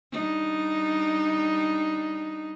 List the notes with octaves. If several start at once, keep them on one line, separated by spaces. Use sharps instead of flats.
G3 D4 D#4